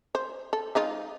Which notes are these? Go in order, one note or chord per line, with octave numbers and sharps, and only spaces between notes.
C5
A4
G#3 D#4 F4